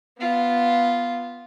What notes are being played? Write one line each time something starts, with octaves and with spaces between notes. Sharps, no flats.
B3 F4